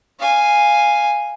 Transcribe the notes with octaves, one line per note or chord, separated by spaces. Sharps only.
F5 G#5